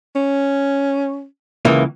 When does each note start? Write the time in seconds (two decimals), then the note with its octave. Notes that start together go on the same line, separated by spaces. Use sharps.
0.15 C#4
1.65 C#2 E3 A#3